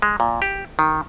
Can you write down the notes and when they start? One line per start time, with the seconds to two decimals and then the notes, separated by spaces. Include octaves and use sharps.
0.02 G#3
0.20 A#2
0.42 G4
0.79 D#3